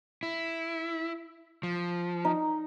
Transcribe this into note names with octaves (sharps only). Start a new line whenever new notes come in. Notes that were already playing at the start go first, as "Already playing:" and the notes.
E4
F3
D#4